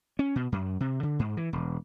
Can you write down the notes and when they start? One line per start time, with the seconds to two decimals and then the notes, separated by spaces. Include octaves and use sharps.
0.19 C#4
0.36 B2
0.52 F#2
0.80 C3
1.03 D3
1.19 G#2
1.37 E3
1.53 E1